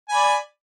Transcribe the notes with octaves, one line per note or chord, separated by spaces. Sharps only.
D5 G#5 B5